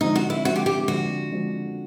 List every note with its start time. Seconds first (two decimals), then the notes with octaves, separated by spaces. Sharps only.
0.01 D3 F3 G#3 C4 D#4
0.16 F#4
0.30 E4
0.45 D3 F3 G#3 C4 F#4
0.56 G4
0.66 G4
0.88 D3 F3 G#3 C4 F#4
1.31 D3 F3 G#3 C4